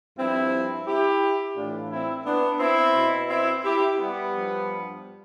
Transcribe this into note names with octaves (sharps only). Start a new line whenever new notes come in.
G2 F3 C4 E4
E4 G4
A2 E3 D4 F4
C4 E4
B3 D4
C4 E4
B2
C4 E4
E4 G4
G3 B3
G2 F3